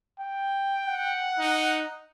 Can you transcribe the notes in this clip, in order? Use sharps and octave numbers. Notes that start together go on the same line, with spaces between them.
G5
F#5
D#4